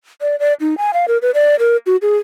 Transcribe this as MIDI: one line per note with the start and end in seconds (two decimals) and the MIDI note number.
0.22 0.36 74
0.40 0.53 74
0.60 0.77 63
0.78 0.91 80
0.94 1.06 77
1.08 1.18 70
1.22 1.31 71
1.34 1.56 74
1.59 1.77 70
1.86 1.96 66
2.02 2.17 68